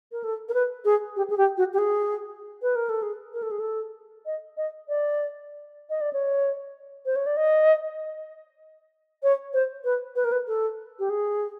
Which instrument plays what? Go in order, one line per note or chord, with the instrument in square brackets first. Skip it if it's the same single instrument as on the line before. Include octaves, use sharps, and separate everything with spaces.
[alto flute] A#4
A4
A#4
B4
G#4
G4
G#4
G4
F#4
G4
G#4
B4
A#4
A4
G#4
A#4
A4
G#4
A4
D#5
D#5
D5
D#5
D5
C#5
C5
C#5
D5
D#5
C#5
C5
B4
B4
A#4
B4
A4
G4
G#4